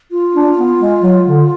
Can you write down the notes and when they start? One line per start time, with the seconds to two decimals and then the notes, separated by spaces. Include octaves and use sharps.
0.11 F4
0.35 D4
0.57 B3
0.80 G#3
1.02 F#3
1.26 D3